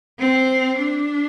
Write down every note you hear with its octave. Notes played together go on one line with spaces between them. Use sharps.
C4
D4